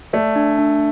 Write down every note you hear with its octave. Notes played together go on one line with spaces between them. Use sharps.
A3 D5
D4
D4